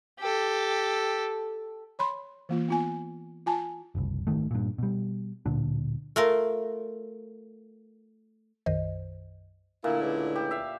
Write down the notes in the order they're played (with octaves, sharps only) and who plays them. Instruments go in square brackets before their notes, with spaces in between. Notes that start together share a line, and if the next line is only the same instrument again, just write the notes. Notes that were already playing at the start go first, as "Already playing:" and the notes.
[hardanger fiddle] G4 A4
[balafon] C#5 B5 C6
E3 A#3 F4
B3 F4 G#5
F4 G#5 A5
[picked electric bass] F#1 C2
G#1 F2 D#3 A3
G2 A#2
B2 G3
D1 A#2 D3 D4
[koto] A3 F4 A#4
[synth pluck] B1 F#2 D#3 C5 D#5
[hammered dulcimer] A#2 [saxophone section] D3 A3 E4 [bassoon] A#3
[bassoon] C#2
[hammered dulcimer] G4
E5 F5